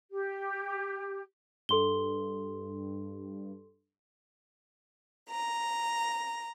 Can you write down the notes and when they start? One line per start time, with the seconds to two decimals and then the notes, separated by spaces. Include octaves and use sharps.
0.11 G4
1.69 G2 A4 C6 G7
5.29 A#5